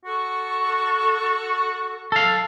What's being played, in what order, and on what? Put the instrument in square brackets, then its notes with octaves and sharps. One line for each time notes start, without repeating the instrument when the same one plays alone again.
[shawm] F#4 [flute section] A4 C#6
[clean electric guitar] A4 F5